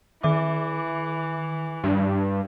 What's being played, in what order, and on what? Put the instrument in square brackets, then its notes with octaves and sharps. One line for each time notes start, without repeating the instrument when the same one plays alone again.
[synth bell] D#3 E5 D6 [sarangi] E3
[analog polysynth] G2